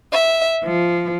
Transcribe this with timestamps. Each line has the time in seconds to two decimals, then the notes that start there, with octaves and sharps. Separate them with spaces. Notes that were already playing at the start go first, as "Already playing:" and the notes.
0.12 E5
0.62 F3